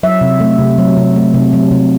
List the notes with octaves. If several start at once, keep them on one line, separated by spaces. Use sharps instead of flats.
F#3 E5
C3
A3
C3
F#3
C3
A3
C3
F#3
C3